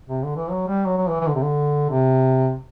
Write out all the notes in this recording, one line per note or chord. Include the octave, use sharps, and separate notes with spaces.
C3
D3
E3
F#3
G3
F#3
F#3
E3
E3
D3
C3
D3
C3